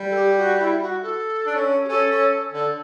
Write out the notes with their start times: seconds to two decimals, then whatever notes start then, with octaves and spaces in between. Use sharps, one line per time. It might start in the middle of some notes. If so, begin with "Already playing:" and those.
Already playing: G3
0.10 A4
0.15 G4
0.37 F#4
0.59 E4
0.81 F#4
1.02 A4
1.47 D4
1.55 C#4
1.84 G4
1.88 C#4 A4
2.10 C#4
2.52 D3 A4